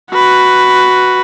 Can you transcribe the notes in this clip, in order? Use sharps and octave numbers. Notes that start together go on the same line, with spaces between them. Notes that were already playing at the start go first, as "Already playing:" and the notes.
F#4 B4